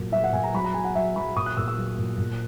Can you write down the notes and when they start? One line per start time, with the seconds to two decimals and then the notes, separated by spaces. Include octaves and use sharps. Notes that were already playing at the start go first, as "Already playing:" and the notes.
Already playing: A#2 F#3
0.12 F#3 E5
0.24 F#5
0.33 A#2 G#5
0.44 A#5
0.54 F#3 B5
0.64 A#5
0.74 F#3 G#5
0.85 F#5
0.95 F#3 E5
1.16 F#3 B5
1.36 A#2 D#6
1.46 F#6
1.57 A#2 E6
1.68 E6
1.78 F#3
1.98 A#2
2.18 A#2